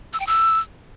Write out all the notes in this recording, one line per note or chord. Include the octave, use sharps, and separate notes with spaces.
E6
G5
E6